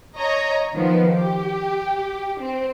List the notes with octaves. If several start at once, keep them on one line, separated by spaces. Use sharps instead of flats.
C#5 D#5 A#5
D#3 F3 B3
G4
C4